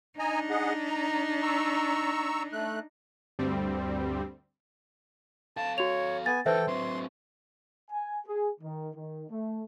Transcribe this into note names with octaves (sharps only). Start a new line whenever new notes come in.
D4 D#4 D#5 G#5 A#5
G#4 D#5 F#5
A#5
A#5 C#6 E6
A3 F#6
D2 G2 G3 C4
A4 F5 A5
F#4 C#5 F7
B3 G#5 A6
E3 D#4 A4 B4 C5 E5 G5
F#3 C4 C6
G#5
G#4
D#3
D#3
A3